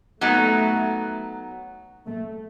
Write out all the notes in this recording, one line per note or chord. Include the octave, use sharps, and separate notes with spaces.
F#3 A3 B3 D#4
A3